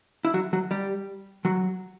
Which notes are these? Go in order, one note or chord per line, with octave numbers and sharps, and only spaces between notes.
E4
F#3 F#4
F#3 F#4
G3 G4
F#3 F#4